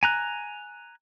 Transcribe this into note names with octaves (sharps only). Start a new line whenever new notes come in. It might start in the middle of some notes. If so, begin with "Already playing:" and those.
G#5 A#5 F#6